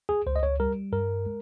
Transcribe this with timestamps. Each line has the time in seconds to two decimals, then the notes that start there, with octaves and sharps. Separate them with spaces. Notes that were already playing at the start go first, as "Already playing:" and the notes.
0.09 G#4
0.26 C#2 C5
0.36 D#5
0.43 C#5
0.60 G3 A#4
0.92 G2 A#4
1.26 G#3